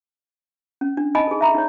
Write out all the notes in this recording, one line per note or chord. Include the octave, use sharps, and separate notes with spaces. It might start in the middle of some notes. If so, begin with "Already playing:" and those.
C#4
D4
D#4 D#5 G#5 A5 B5
G#4 A4
E5 A#5 B5
D#4 C#5